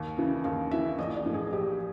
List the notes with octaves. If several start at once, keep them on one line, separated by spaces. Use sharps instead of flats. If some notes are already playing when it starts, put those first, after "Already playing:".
Already playing: D#2
C#3 E3
D#2 F5
C#3 E3 E5
A#1 D#5
D5
A2 E3
G#4
A#1 G4